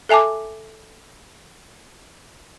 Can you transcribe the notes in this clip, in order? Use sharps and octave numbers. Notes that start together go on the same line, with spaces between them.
A4 E5 G#5 A5 D6